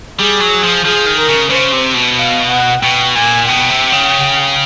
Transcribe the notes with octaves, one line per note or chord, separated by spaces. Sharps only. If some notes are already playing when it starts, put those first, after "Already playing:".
G3 G#4
F#3
F3
F3 G#4
D#3
A#4
C#3
C#3 C5
C3
B2
F5
F#5
B2 G5
A#2 G#5
B2 G5
C3
C#3